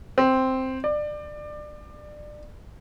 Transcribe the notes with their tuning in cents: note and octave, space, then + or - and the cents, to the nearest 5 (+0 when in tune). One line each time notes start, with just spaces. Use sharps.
C4 +0
D5 +25